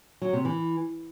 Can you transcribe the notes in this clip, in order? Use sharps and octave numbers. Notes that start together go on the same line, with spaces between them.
F#3
C3
E3